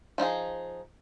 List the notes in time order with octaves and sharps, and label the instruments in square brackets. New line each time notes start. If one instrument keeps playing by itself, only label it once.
[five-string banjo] F3 D#4 F4 G#4